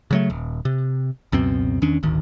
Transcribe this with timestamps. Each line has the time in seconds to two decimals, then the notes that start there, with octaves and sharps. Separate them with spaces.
0.11 C#3 F#3 A3
0.30 D#1
0.65 C3
1.32 C#2 F#2 B2 C4
1.82 E2 D#3 C#4 D4
2.03 D#1 G#1 D2 D#3